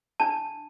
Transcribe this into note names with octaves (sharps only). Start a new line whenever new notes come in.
D4 A5